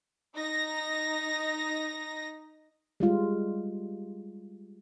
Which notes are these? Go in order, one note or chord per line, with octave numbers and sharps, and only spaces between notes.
D#4 A#6
G3 G#3 F4